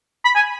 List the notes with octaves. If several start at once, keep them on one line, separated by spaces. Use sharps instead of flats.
B5
G#5